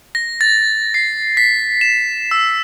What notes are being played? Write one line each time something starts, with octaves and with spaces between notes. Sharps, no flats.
A#6
A6
C7
B6
E7
E6